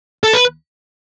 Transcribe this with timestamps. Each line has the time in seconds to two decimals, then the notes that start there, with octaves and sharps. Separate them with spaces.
0.24 A4
0.33 B4